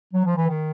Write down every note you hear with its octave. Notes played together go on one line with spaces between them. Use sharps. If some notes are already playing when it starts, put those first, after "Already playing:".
F#3
F3
E3
D#3